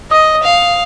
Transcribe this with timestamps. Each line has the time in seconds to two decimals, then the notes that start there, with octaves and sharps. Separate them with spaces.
0.11 D#5 D#6
0.43 F5